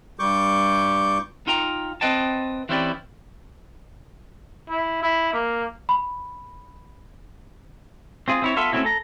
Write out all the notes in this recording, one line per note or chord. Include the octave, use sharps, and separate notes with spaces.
G2 G3 C#6 D6 G6
D#4 F4 G5 A#5
C4 B4 D#5 G5 A5
E3 C4 C#4 E4 G4 D5
E4
E4
A#3
B5
C4 F4 G#4
C4 E4 C#5
B3 F4 A4 E5
A3 C4 C#4 E4 F#4
A4 A#5